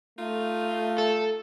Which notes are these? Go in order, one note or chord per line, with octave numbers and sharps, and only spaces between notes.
A3 D#4 F4
A4